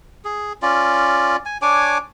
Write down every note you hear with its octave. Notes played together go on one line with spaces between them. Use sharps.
G#4
C#4 F4 D5
G#5
D4 C#5 G#5 D6